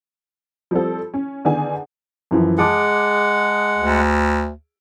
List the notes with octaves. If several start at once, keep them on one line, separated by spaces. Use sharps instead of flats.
F3 G3 C4 A4
C#4
D3 D#3 B3 D4 G#4 G#5
F#2 E3 F3
G#3 G#4 F#5 A5 D6
D2